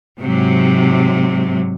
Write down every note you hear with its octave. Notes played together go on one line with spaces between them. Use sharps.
G#2 C3 F#3